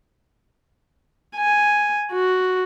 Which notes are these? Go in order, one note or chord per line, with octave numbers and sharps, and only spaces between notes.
G#5
F#4